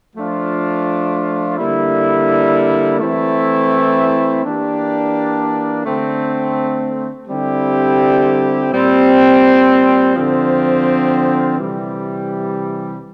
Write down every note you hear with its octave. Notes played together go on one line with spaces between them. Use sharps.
F3 A3 D4 F4
D3 G3 A#3 E4
E3 A3 C4 E4
E3 A#3 D4 G4
D3 A3 C4
D3 G3 C4 E4 G4
A#2 G3 C4
D3 F3 C4
C3 E3 G3